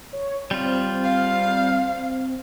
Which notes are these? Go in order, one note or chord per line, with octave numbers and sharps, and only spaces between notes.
C#5
G3 C4 F4
F5